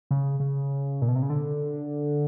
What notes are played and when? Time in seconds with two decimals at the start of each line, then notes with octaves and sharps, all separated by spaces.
0.11 C#3
0.40 C#3
1.02 A#2
1.08 B2
1.16 C3
1.22 C#3
1.30 D3